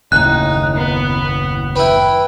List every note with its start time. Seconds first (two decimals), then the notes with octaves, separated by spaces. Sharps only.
0.12 F#1 D#2 A2 D#4 F#6
0.75 B3
1.76 E4 B4 G5